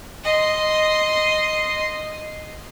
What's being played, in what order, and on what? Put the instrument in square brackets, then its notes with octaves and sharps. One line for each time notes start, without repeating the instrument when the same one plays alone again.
[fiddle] D#5 C6